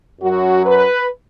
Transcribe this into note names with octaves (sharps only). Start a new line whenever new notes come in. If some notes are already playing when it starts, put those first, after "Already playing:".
F#2 F#3 F#4
B4